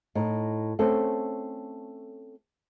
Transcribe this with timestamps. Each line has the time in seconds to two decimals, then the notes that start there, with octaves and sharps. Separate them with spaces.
0.15 A2 D#4
0.79 A3 C4 C#4 A4